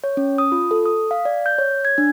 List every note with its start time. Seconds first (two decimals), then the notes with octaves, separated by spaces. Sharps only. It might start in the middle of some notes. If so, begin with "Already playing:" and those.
0.04 C#5
0.17 C#4
0.38 D#6
0.52 F4
0.71 A4
0.86 D#6
1.11 F5
1.25 D5
1.46 G6
1.58 C#5
1.85 G#6
1.98 D4